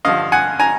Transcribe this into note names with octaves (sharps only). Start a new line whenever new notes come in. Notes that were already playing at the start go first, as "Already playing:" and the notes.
G2 D3 F3 D#5 F5
F#5 G#5
G#5 A#5